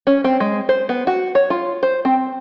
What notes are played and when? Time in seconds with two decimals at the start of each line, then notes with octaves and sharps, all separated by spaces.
0.07 C#4
0.24 C4
0.40 G#3
0.69 C5
0.89 B3
1.07 F#4
1.35 C#5
1.50 F4
1.83 C5
2.05 C4